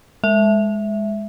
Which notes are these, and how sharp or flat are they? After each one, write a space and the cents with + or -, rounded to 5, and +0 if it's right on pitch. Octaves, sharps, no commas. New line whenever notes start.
G#3 +0 E5 +0